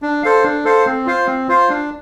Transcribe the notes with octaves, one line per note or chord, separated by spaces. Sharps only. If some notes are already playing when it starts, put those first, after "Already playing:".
D4
A4 C5 F5
D4
A4 C5 F5
C4
F4 C5 F5
C4
F4 C5 F5
D4